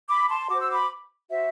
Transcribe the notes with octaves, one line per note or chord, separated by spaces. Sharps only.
B5 D6
A5 C6
F#4 C5 D6
E6
B5 D6
F#4 C5 E5